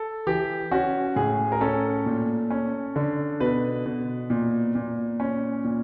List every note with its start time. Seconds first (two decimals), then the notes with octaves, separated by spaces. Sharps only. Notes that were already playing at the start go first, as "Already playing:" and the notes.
Already playing: A4
0.27 E3 G4
0.71 C#4 F#4
1.16 A2 G#4
1.52 A#4
1.61 C#4 A4
2.06 A#2
2.51 C#4
2.96 D3
3.40 B2 B4
3.86 B2
4.30 A#2
4.75 A#2
5.20 C#4
5.65 A#2